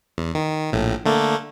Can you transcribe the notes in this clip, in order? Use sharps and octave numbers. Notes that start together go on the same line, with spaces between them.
E2
D#3
A#1 A2
D3 A3 A#3